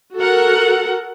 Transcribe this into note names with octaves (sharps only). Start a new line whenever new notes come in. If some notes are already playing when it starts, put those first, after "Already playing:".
F#4 A4 A#4 F#5